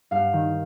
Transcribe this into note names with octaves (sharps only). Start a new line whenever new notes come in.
G2 F5
D#3